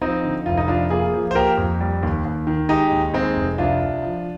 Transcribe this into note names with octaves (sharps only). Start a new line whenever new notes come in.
F3 C4 D#4
D3
F1 F4
D#4
F3 D4 F4
A#3 F4 G#4
F3
C5
A#3 G4 A#4
F2
G3
D#2
D#2
D#3
G#3 D#4 G4
D#2
G#3 C4 D#4
F1
C2 D4 F4
C2
F3